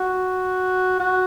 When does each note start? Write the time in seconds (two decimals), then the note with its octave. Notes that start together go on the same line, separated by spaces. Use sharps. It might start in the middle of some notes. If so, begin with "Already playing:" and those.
Already playing: F#4
1.00 F#4